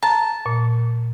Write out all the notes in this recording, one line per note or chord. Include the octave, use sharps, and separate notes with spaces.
A5 A#5
A#2